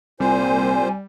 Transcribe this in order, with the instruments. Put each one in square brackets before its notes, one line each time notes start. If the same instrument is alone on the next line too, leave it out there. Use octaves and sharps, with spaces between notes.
[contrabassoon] C2 [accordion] A#2 C5 [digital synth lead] G3 [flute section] G#5